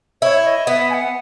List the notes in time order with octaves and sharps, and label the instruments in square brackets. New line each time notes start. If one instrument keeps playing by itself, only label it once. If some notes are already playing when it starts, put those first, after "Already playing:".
[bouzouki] E4 [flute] C#5
[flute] D#5
[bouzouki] B3 [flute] E5
[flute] G#5
F#5